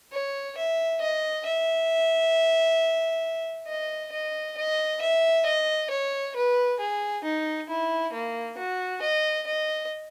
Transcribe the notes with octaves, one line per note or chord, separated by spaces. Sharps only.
C#5
E5
D#5
E5
D#5
D#5
D#5
E5
D#5
C#5
B4
G#4
D#4
E4
A#3
F#4
D#5
D#5